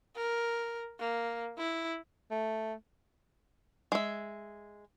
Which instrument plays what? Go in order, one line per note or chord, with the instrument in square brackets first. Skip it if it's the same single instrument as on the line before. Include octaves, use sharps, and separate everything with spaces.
[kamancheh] A#4
A#3
E4
[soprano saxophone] A3
[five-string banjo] G#3 E5